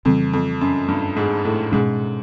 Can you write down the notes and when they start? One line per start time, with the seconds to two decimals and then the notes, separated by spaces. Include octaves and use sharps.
0.05 F2 C#3 E3 G3
0.33 F2
0.61 F#2
0.88 G2
1.16 G#2
1.45 A2
1.72 G#2 B2 G#3 C#4